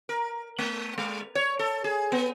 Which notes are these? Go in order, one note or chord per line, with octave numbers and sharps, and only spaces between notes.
A#4
A3
G#3
C#5
A4
G#4
B3